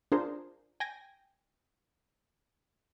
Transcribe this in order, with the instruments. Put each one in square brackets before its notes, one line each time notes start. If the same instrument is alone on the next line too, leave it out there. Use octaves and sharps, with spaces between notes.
[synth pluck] D4 F4 G#4 A#4 C5
G5 G#5 A#6